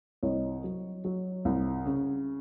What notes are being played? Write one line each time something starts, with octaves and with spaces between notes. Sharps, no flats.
C2 C#5 D#5
F#3
F#3
C2
C#3